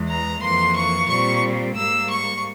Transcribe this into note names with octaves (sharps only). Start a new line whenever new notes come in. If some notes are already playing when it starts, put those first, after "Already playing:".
Already playing: E2 E3 G#3
A#5
F2 E3 A#3 C6
C#6
A#2 G3 C4 C#6
G#2 G3 A#3 E6
C#6